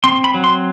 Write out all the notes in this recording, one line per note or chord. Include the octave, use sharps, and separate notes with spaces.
C4 C6
B5
F#3
C6